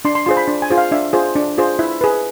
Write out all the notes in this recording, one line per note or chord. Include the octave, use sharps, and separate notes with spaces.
D4 C6
C6
F4 G#4 C5 C6
B5
D4
G#5
F4 G#4 C5
F5
D4 E5
F4 G#4 C5
D4
F4 G#4 C5
E4 E5
G#4 B4